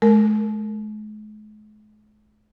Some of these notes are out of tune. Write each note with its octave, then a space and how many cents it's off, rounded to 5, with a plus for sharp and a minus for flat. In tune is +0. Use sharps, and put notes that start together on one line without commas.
G#3 +45 A#4 -10